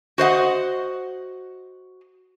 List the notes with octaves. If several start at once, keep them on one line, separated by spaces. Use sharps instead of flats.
F#4 C5 D#5 F#5